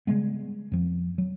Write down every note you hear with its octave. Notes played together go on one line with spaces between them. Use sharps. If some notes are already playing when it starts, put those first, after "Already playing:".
C#3 G3 G#3 B3
F2 F3
F#3